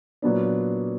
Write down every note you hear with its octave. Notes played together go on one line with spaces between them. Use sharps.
A#2 F#3 B3 D4